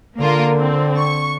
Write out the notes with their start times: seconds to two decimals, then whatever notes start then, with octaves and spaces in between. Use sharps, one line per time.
0.19 D3 A#3 F4 A#4
0.57 C4
1.00 C#6